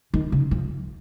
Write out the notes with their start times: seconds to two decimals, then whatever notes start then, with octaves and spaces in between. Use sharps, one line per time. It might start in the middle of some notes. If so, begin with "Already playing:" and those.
0.14 D#3
0.32 C#3
0.51 F3